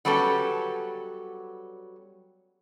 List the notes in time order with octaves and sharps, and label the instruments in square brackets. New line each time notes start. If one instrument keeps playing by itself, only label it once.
[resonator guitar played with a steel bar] F#3 G3 B3 C#4 A4